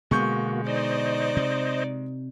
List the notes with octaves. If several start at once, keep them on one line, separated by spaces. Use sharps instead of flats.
B2 D3 G#3 A#3 B3 F#4 C#6 G6
D#4 C5 D5 D#5
C3